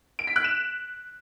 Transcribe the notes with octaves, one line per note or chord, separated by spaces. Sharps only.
D7
B6
F#6
E7